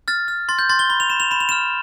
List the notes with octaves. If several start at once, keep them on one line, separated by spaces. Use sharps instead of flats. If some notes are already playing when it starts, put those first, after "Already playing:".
F6 A6
F6
C6 A6
G6
C6 A6
G7
B5 G7
F7
B5 E7
F7
B5 E7
F7
F6 E7